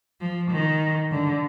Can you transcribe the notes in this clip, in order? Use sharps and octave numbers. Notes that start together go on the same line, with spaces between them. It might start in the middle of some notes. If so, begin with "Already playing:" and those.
F3
D#3
D3